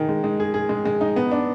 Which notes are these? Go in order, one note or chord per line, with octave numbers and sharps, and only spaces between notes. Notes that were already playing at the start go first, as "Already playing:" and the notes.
Already playing: D#3 D#4 G#4
G#3
G#3
G#4
G#4
G#3
G#3
D#4
B3
D4